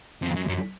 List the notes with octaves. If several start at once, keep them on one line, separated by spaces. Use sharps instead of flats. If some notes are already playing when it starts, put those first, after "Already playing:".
F2
F#2
F#2